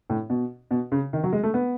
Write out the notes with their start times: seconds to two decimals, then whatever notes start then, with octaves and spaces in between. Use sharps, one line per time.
0.10 A2
0.30 B2
0.71 B2
0.92 C#3
1.13 D#3
1.23 F#3
1.33 G#3
1.43 A3
1.54 B3